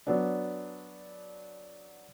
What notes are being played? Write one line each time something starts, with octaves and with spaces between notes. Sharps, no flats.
F#3 B3 D4